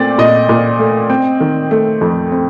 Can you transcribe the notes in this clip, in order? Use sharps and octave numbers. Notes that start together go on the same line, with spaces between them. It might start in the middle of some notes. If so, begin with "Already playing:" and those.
Already playing: A#2 A3 C4 D5
A#2 D#5
A#2
A3
C4
D#3
A3
F2
C4